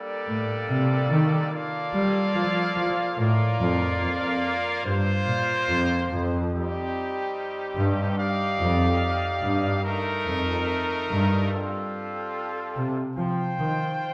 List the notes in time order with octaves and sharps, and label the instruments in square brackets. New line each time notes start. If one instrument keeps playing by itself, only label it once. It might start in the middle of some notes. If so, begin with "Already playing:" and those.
Already playing: [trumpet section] G3 A#3 D4 A4 D5
[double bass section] A2
C3
D#3
[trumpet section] A#3 F4 A4 D5 F5
[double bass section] G3
F3
F3
[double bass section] A2 [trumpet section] A#3 F4 A#4 D5 F5
[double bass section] F2
F2
[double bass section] G2 [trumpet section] A#3 F4 C5
[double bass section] A#2
F2
F2
[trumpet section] G3 C4 D#4 G4
[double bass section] G2
[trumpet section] D#4 G4 D5 F5
[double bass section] F2
G2
[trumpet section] A3 D#4 A#4
[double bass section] F2
G2
[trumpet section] G3 C4 F4 A4
[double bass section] C3
[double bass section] F3 [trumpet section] F4 C5 G5
[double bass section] D#3